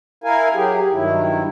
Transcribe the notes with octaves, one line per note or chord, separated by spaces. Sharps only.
E4 A#4 F5 G#5
F#3 G4 G#4
G2 D#3 F#3 E4